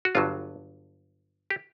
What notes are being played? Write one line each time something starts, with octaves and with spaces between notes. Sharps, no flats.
F#4
G1 G2 D3 F#3 F4
G4